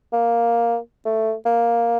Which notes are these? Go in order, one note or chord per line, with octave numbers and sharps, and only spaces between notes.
A#3
A3
A#3